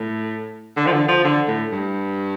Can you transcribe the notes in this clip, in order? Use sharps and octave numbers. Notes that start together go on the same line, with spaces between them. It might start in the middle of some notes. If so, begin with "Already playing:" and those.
Already playing: A2
D3
F3
D3
F3
D3
A2
G2